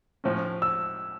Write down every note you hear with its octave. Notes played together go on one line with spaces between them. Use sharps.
A2 F3 C#4
E6